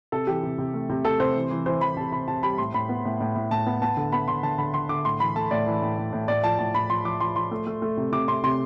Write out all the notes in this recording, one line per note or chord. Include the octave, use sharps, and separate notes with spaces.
C3 A4
E3 G4
C3
C3
A3
C3
A3 A4
C3 C5
E3
E3
E3 C5
E3 B5
C3 A5
C3 B5
C3 A5
G3 B5
A2 C6
A2 B5
B3
A2
A2
A2
A2 A5
B3
B3 A5
D3
B3 B5
D3 C6
D3 A5
D3 B5
D3 C6
D3 D6
A2 C6
E3 B5
A3 A5
A2 D5
E3
A2
A2
A2
A2 D5
F3 A5
A2 A5
A2 B5
F3 C6
F3 D6
F3 C6
F3 C6
A3
A3
A3
C3
C3 D6
C3 C6
C3 C6